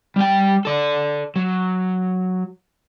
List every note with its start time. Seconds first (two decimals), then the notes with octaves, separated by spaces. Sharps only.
0.16 G3 G5
0.65 A4 D5
1.36 F#3